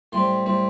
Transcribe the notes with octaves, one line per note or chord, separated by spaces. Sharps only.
A2 G3 C4 C6
A2 G3 C4